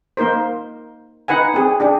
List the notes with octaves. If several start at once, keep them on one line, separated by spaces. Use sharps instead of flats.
A#3 D#4 A#4 C5
D#4 B4 F#5 G#5
C4 G4 G#4
D4 G4 G#4